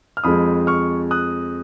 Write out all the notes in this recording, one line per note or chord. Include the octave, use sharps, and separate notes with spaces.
F6
F2 F3 G#3 B5 D#6
C#6 F6
D#6 F#6